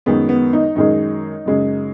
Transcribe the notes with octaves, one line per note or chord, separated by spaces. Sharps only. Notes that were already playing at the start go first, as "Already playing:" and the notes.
F#2 D#3 G#3 B3
B3
D#4
F#2 D#3 G#3 D#4
F#2 C#3 G#3